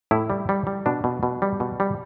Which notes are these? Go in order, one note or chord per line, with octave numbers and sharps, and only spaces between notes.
A2 E4
G3
G3
G3
B2 D4
B2
B2
G3
B2
G3